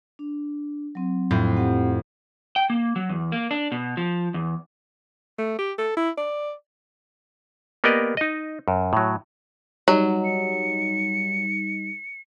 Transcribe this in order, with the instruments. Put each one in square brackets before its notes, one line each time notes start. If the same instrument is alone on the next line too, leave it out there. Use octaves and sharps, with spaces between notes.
[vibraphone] D4
F#3 C4
[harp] F2 A2
[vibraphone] C4 G4 F#5
[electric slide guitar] G5
A#3
F#3
E2
A#3
D4
B2
F3
E2
[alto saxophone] A3
G4
A4
E4
D5
[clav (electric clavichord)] A#3 B3 G4 A#4 D5 D#5
D#4 D#5
F#2
A2 F#3
[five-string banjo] F#3 [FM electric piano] G3 D#4
[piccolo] C#7